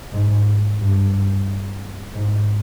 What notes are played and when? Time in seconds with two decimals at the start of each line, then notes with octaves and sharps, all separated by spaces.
0.12 G#2
0.79 G2
2.13 G#2